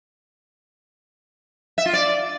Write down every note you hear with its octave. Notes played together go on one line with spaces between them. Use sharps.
E5
F4
D5